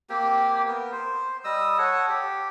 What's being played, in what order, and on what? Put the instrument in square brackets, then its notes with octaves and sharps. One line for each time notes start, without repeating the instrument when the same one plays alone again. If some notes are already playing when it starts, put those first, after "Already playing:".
[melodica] A#3 C4 G4
B3 A#4
C5
G3 D#5 D#6 E6
A4 C#5 F#5
G4